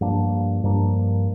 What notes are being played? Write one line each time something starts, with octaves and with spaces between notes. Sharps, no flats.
G2 F3 A#3 D4
G2 F3 A#3 D4